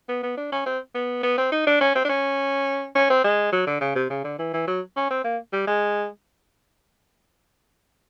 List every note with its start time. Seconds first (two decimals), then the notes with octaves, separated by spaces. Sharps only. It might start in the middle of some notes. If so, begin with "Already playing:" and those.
0.09 B3
0.23 B3
0.37 D4
0.52 C#4
0.66 C4
0.95 B3
1.23 B3
1.38 C4
1.52 D#4
1.67 D4
1.81 C#4
1.95 C4
2.05 D4
2.09 C#4
2.95 C#4
3.10 C4
3.24 G#3
3.52 F#3
3.67 D3
3.81 C#3
3.95 C3
4.10 C#3
4.24 D3
4.39 E3
4.54 E3
4.67 F#3
4.96 C#4
5.10 C4
5.24 A#3
5.53 G3
5.67 G#3